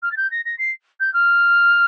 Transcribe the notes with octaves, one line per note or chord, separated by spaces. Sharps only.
F6
A6
G6
A#6
A#6
C7
G6
F6